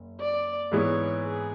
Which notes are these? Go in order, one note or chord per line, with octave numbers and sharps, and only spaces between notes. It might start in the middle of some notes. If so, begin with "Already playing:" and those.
Already playing: F#1
D5
G#2 E3 G#3 B3 E4 C#5
G#4